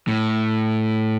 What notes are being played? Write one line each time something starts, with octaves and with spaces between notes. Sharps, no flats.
A2